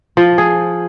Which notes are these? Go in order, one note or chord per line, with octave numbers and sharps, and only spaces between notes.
F3
G#4